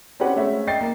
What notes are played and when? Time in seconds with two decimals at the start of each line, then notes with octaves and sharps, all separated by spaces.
0.20 C4 C#4 F#4 G4 B4 F#5
0.36 G#3 A3 C4 C#4 E5
0.67 D#5 G5 A6 C7
0.81 A#3